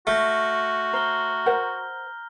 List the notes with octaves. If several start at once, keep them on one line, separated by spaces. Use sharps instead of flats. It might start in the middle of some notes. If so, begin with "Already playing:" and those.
A3 F#4 F6 G6 A#6
C5 A#5 F6 G7
A#4 C5 F#5